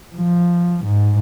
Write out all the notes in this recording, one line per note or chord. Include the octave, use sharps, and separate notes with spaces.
F3
G#2